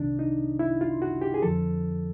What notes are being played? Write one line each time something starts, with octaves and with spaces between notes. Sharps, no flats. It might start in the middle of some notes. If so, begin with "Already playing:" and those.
Already playing: C2 C3 D#3 D4
D#4
E4
F4
F#4
G4
G#4
F2 D3 F3 A4